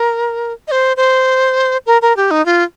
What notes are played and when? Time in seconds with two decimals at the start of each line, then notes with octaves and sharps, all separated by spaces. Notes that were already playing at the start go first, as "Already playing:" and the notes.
Already playing: A#4
0.68 D#5
0.72 C5
0.97 C5
1.86 A#4
2.02 A#4
2.17 G4
2.31 D#4
2.46 F4